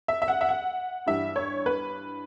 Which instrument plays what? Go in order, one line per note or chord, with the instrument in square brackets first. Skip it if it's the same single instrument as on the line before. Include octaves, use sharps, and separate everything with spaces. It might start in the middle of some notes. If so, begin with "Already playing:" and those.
[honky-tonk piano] E5
E5
F#5
E5
F#5
G2 E3 G3 E5
C#5
B4